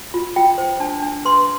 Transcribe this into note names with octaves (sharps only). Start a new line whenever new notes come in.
F4
F4 G5
C5
D4 A5
D4
B4 C6